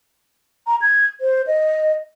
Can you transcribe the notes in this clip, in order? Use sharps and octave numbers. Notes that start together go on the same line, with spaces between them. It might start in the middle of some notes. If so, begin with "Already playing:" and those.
A#5
G#6
C5
D#5